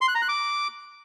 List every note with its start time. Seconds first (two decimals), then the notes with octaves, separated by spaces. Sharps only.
0.01 C6
0.08 F#6
0.15 A#5
0.22 F#6
0.28 D6